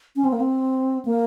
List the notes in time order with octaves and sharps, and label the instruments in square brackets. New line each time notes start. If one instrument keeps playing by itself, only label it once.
[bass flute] C#4
C4
A#3
C4
A#3